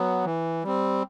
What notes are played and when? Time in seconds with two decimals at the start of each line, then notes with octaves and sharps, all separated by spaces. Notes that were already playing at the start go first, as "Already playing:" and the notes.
Already playing: F#3 B3
0.25 E3
0.64 G3 C4